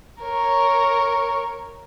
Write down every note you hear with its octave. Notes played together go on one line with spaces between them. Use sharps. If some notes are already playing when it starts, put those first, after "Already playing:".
A#4 C#5